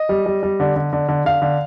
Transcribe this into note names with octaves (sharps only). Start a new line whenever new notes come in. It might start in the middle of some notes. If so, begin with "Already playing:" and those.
Already playing: D#5
G3
G3
G3
D3
D3
D3
D3
D3 F5
D3